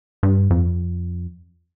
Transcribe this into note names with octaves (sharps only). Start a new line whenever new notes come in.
G2
F2